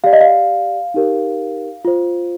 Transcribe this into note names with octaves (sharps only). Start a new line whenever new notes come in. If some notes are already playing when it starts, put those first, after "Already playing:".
G4 D5 F5
D#5
F5
D#4 G4 A#4
F4 C5